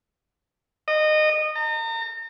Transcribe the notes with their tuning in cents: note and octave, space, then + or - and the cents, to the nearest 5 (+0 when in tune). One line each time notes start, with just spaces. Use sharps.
D#5 -20
A#5 -40